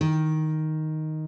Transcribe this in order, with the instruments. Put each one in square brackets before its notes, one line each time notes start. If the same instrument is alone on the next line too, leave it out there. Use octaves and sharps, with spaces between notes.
[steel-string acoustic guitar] D#3